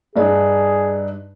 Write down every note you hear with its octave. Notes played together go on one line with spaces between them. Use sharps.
G2 D4 D#4 G#4